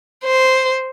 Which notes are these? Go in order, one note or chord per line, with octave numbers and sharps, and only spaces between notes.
C5